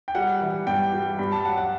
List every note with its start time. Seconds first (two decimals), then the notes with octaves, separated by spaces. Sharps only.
0.08 G5
0.15 G3 F#5
0.41 E3 F#5
0.67 G2 G5
0.93 G3
1.19 G2 B5
1.32 A5
1.45 F#3 F#5
1.58 F#5